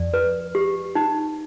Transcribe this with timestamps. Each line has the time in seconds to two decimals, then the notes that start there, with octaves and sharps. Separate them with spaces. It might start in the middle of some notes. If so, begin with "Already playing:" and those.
Already playing: F2 D5
0.14 B4
0.55 G4
0.95 D#4